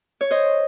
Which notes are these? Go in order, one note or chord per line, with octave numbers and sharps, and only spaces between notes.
C#5
C5 D#5